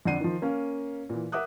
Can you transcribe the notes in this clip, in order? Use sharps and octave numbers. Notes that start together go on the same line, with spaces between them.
F2 D3 D4 F#5 C7 D#7
D#3 F3
A#3 C#4 F5
A#2 E3
A#4 E5 F#5 D6 D#6 F#6